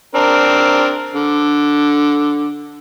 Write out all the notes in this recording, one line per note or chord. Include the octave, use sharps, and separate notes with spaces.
C4 D4 A#4
D3